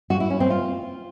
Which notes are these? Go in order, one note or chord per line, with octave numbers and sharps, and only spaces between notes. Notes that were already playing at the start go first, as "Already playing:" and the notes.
F#4
E4
C#4
C4
F4